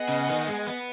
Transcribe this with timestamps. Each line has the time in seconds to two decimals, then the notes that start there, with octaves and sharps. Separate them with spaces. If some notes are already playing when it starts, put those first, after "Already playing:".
Already playing: B3 G#4 D#5 F#5
0.09 C#3
0.28 D#3
0.48 G#3
0.67 B3